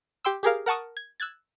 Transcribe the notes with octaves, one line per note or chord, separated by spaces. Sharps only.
G4 G5 C6 E6
G4 G#4 A#4 F5
A#4 F#5 A5 C#6 D#6
G#6
E6 F#6 G#6 A6